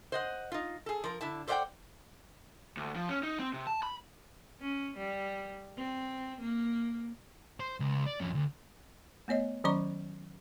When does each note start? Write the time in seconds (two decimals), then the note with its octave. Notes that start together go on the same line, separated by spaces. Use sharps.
0.12 C5 D#5 F#5
0.52 D#4 F4
0.86 G#4 A4
1.04 F3 A#4
1.21 D3 E4 A5
1.48 A4 C5 D5 E5 F#5 G5
2.77 D2
2.96 F3
3.09 C#4
3.23 D#4
3.39 C4
3.53 C3
3.67 A5
3.83 B5
4.61 C#4
4.97 G3
5.77 C4
6.40 A#3
7.60 C5
7.80 C#2
8.06 D5
8.20 F2 C#4
8.35 D2
9.28 A3 B3 C#5 D#5
9.64 D#3 F#3 C#4 D5 A#5 C#6